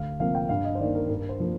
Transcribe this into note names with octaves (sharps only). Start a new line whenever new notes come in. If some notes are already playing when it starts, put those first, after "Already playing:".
Already playing: D2 F5
C3 F3 A#3 F5
G5
G2 F5
D#5
C5
D#3 A#3 D5
A#4
G2 A#4
C5
F3 A#3